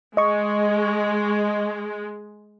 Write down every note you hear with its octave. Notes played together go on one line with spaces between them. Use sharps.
G#3 D#5 C#6